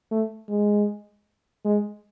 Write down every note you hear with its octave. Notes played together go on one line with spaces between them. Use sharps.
A3
G#3
G#3